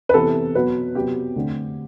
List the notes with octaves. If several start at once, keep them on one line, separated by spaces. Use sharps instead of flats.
B4
C3 E3 B3 A4
B2 F#3 B3 B4
C3 F#3 B3 G4
D3 A3 C4